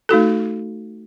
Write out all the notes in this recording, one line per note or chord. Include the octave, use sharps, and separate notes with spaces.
A3 D#4 F#4 A4